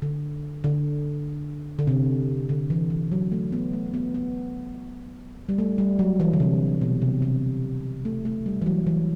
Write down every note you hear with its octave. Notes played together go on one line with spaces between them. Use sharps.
D3
D3
D3
C3
D3
E3
E3
F#3
A3
B3
A3
B3
B3
G3
A3
G3
F#3
E3
D3
C3
B2
C3
C3
A3
A3
G3
E3
F#3
E3